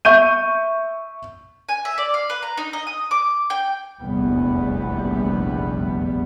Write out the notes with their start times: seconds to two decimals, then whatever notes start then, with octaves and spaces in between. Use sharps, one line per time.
0.05 E5 C#6 G6 D#7
1.69 G#5
1.85 E5
1.98 D5
2.14 F5
2.30 B4
2.43 A#5
2.58 D#4
2.73 D#5
2.87 D#6
3.11 D6
3.50 G5
4.01 F1 A#1 E2 G3 B3